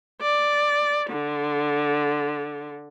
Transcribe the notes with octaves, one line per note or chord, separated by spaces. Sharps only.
D5
D3